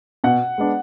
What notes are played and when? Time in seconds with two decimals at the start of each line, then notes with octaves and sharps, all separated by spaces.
0.24 B2 F#5
0.58 G#3 B3 D4